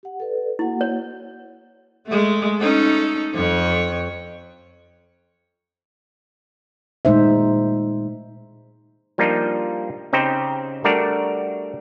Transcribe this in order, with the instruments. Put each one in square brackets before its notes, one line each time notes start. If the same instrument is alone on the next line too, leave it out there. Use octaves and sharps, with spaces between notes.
[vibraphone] G4 F#5
A4 B4 D5
[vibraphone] A#3 F#4 F#5 [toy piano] E4
[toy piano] C#5
[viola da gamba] G#3 A3
C#4 D#4 A4
F2 C#5
[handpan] A#2 G#3 A3 D#4 C5 E5
[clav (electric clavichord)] F3 G3 A#3 D4 D#4 F4
C#3 C4 D#4 G4 C5
G3 A3 D4 F#4 A#4 D5